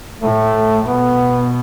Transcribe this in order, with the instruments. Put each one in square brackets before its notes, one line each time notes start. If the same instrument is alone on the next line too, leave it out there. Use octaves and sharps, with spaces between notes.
[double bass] A2 [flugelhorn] A3
[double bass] B2 [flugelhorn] B3